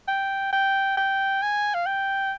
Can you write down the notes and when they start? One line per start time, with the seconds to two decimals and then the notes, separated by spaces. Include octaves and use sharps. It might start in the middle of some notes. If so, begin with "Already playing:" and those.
0.08 G5
0.53 G5
0.97 G5
1.42 G#5
1.74 F5
1.86 G5